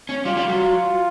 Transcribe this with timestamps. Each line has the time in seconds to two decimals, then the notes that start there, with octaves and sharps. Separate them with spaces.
0.09 C#4
0.25 G3 F4
0.37 G3
0.48 F#3
0.58 F4